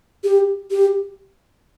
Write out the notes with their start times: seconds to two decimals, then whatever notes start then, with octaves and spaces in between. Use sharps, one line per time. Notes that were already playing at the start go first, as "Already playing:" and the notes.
0.24 G4
0.71 G4